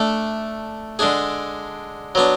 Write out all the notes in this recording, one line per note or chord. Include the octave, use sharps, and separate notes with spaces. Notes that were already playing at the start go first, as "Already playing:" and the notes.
Already playing: A3 D4 A4
D3 G#3 D4 G#4
F#3 B3 D4